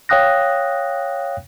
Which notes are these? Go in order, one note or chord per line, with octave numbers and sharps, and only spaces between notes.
C#5 F5 G5 D#6 F#6 A#6